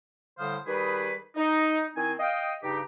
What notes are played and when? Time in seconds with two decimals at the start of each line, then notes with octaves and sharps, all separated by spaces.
0.39 A2 D3 G3 C5 F5 D#6
0.67 D#3 G3 G4 G#4 B4
1.36 D#4
1.96 D#3 C4 E4 G#5
2.19 D#5 F5 G5
2.63 G2 C#3 D#4 G4